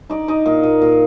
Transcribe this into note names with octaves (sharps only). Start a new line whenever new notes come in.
D#4 D5
D#4 D#5
A#2 D#5
A#2
A#2